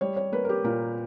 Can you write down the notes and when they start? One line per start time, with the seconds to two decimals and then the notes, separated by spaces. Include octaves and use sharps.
0.01 G3 C#5
0.16 C#5
0.32 A#3 B4
0.45 A#4
0.49 G4
0.64 A#2 A#4